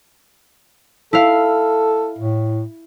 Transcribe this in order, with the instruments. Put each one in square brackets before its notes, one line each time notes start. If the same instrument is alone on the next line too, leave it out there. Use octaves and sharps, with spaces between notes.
[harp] E4 F5 [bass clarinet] A4
[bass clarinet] A2